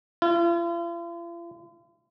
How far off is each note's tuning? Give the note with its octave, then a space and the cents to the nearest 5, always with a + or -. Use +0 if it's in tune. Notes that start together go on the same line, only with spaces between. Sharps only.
F4 -45